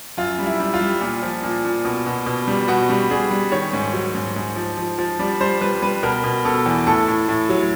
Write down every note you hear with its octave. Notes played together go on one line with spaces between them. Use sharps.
F#2 F4
G3
E4
G3
F4
G3
A#2
F3
A#2
A#2
B2
B2
B2
G3
B2 F#4
G3
G3 G#4
G3
D#3 C#5
G#2
F#3
G#2
G#2
F3
F3
F3
G3 D5
G3 C5
G3 B4
G3 B4
B2 A#4
B2
B2 A4
E2
A2 A4
A2
A2
F#3